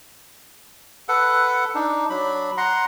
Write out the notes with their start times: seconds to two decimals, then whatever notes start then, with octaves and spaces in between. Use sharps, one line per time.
1.09 A4 B4 F#5
1.75 D4 D#4
2.10 F#3 D4 B5
2.57 F#5 A#5 C6